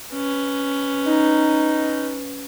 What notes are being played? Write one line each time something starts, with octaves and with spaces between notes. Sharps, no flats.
C#4 B4
D#4